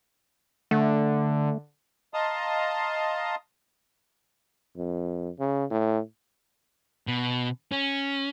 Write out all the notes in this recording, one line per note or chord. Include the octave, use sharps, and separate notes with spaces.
D3 A3
D#5 F5 A5 A#5 C6 D#6
F2
C#3
A2
B2
C#4